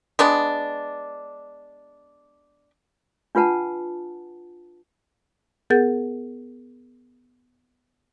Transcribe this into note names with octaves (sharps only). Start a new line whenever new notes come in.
G#3 B3 D4
D4 F4 B4 F#5 A5
B3 G#4 A#4 F#5 G6 A6